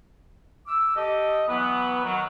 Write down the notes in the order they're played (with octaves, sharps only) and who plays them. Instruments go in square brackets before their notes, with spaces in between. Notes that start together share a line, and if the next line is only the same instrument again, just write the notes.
[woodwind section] D6 E6
G4 A4 D#5
E3 F#3 B3
D#3 F#3